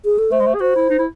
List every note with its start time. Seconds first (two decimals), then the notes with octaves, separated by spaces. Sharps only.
0.05 G#4
0.18 A4
0.31 A3 C5
0.40 G#3
0.46 A3
0.54 G#4
0.60 F#4 C5
0.76 E4
0.90 D#4
0.98 E4